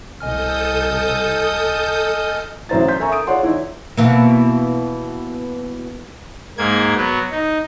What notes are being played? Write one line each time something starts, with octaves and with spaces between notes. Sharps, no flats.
C2 A4 D#5 G#5 D#6 F6 G6
A1 F#3 E4 C5 A#5 A6
C6 G6 B6
A4 A#4 E5 G#5 A#5 C#6
D#6 D7
F4 G#4 C#5 D5 F#5 C6
E3 D#4 E4 C#5
B2 E3 A#3
G#2 A#3 G#6
F#3 B3
D#4